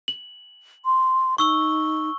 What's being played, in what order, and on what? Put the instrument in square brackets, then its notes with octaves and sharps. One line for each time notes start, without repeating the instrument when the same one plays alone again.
[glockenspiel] F#7
[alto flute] C6
[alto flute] D#4 [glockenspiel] C#6 E6 G7